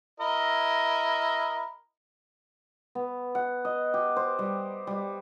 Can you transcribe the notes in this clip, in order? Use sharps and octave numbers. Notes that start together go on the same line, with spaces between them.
E4 A#4 D#5
B3
F#5
D#5
G4
C5
G3
G3